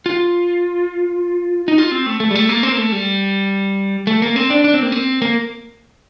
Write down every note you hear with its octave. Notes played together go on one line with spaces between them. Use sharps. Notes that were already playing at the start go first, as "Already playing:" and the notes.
F4
D#4
F4
C4
A3
A3
G3
A3
A#3
C4
A#3
A3
G3
A3
A#3
C4
D4
D4
C4
A#3
C4
A#3